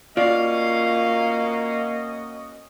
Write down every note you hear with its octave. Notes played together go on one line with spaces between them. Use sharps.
A#3 C#4 F4 F#4 D5 D#5 F5